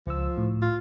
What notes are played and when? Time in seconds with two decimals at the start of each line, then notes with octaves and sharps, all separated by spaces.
0.07 C#2 F3 E6
0.38 A2
0.62 F4